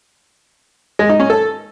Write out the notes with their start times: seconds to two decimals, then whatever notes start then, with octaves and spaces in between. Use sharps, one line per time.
0.99 G#3
1.09 D#4
1.20 C#4
1.30 A4